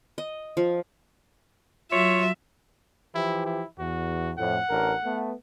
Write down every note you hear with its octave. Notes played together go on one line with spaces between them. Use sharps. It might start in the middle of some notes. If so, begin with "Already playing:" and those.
D#5
F3
F#3 F4 C#5 E5
E3 F3 E4 G4
E4
E2 F#4
F2 A2 F#5
A1 D4 A#4
A3 B3